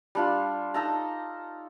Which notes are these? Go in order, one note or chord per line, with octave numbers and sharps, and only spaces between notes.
G3 D4 F4
D#4 A4 A#5